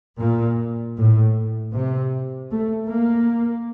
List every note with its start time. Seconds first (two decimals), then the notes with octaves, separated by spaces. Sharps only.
0.20 A#2
0.96 A2
1.74 C3
2.51 A3
2.89 A#3